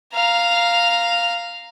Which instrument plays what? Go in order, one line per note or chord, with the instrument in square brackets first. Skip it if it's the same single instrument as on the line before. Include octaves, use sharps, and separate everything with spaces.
[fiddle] F5 A#5